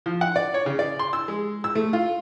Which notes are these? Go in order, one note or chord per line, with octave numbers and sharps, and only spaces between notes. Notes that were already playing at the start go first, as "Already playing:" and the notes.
F3
F#5
D5
C#5
C#3
D5
C6
E6
G#3
E6
A3
F4